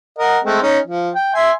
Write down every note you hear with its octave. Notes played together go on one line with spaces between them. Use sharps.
A#4 D#5 F#5
G#3 A3 C4
C#4 D#4
F3
G5
E5 G#5 C6